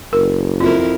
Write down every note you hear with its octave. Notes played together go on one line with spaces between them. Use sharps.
F#1 A#4
F2 E4 F4 A#4